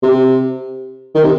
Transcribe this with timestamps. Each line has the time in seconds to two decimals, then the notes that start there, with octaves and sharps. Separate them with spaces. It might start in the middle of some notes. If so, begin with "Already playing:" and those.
0.03 C3
1.15 D#3
1.24 C3